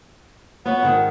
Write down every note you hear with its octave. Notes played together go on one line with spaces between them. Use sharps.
B3 B4 C#5 F#5
G#2 D#3